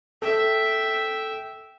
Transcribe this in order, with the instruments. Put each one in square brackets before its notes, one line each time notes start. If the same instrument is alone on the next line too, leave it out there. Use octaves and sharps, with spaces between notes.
[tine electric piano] A4 [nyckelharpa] E5 G5